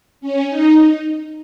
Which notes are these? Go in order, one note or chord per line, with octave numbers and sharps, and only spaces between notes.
C#4
D#4